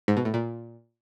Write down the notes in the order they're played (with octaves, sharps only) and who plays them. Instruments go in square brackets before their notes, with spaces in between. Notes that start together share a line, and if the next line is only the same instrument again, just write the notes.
[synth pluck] G#2
B2
A2
A#2